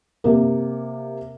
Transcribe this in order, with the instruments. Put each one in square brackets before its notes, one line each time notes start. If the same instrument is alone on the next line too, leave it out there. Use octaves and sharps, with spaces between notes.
[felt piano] C3 A#3